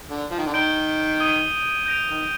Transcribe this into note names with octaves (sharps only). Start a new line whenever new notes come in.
D3
F3
D#3
D3
D#3 G6 D7 G7
D#6 G#6 D#7 G7
G6 A#6 D7 F7
D#3